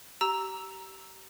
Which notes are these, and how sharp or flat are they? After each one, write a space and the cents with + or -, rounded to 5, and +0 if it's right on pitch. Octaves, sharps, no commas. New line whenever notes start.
G4 -25 A#5 +0 E6 +0